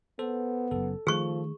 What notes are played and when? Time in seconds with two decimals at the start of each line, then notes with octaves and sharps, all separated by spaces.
0.19 B3 A4 C5
0.71 F#1 F#2 A4
1.07 D#3 F3 A3 G#4 C#6